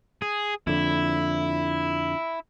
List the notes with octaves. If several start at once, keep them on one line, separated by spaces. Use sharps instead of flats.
G#4
F2 D3 E4